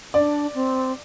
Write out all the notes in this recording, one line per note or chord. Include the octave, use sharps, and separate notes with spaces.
D4 D5
C4